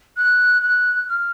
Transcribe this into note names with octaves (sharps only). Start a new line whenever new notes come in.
F#6
F#6
F6